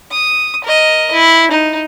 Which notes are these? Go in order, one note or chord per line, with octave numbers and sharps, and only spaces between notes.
D#6
A#4 D#5
E4
D#4